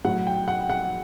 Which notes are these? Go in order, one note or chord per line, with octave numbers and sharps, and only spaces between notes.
A2 F#3 F#5
G5
F#5
F#5